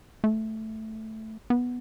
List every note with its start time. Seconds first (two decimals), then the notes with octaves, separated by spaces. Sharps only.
0.24 A3
1.50 B3